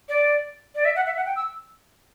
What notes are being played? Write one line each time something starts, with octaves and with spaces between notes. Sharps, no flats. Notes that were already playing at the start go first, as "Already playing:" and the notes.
D5
D5
E5
F#5
E5
F#5
G5
E6